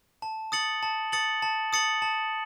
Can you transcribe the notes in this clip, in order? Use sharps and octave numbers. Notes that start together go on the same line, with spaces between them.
A5
D#6 A6 C#7 F#7
A5
D#6 A6 C#7 F#7
A5
D#6 A6 C#7 F#7
A5